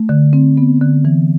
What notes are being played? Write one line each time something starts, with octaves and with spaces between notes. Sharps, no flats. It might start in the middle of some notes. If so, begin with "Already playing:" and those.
Already playing: A3
D3
C4
B3
D3
E3